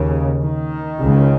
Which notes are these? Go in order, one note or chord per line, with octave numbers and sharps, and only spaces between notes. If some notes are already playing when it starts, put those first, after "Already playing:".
Already playing: D#2 C#3
D#3
C#2 C#3